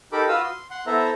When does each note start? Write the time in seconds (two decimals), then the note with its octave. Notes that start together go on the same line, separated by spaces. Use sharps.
0.12 D#4 G4 A4 A#4 B5 D6
0.29 F4 F#4 B4 F5 D#6 E6
0.43 C6
0.71 F#5 C6
0.87 B3 E4 A4 C5 E5 A#5